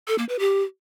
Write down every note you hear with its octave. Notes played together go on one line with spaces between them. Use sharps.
A4
A#3
B4
G4